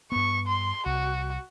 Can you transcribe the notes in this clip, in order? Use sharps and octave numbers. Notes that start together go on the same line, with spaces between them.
G2 B3 C#6
C6
C2 F#4